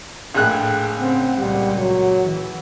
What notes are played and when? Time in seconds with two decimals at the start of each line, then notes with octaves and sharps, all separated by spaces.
0.34 A#1 A2 A3 G#4 G5 F#6
0.98 C#3 C4 F#5
1.38 C#2 A#2 G3 F#5
1.78 F#3
2.25 E3